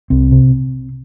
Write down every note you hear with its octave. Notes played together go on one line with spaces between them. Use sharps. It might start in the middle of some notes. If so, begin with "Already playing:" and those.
C2 C4
C3